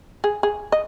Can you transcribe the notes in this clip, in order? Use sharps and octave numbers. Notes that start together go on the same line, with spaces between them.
G#4
G#4
D#5